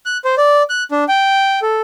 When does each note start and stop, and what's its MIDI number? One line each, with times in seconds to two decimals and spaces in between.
0.06 0.18 90
0.25 0.35 72
0.38 0.63 74
0.70 0.83 90
0.91 1.04 62
1.09 1.60 79
1.62 1.82 69